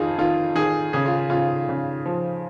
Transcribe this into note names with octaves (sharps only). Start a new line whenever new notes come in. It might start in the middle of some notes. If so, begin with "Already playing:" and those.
Already playing: F2 D#3 F4 G#4
D#3 F4
D#3 G#4
C#3 G#4
F4
C#3 F4
C#3
F3